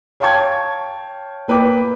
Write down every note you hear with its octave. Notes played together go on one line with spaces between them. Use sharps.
C#5 F5 G5 A5 C#6 G#6
A#3 B4 G5 D6